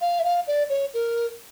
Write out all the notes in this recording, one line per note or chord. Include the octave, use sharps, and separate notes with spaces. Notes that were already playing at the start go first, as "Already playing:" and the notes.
F5
E5
F5
D5
C#5
A#4